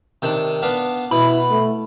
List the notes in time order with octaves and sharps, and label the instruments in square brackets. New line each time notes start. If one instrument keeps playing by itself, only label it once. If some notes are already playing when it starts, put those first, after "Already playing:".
[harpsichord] C3 D#3 D4
B3 D4 F5
[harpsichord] B2 [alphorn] E4 [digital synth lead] B5
[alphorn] A3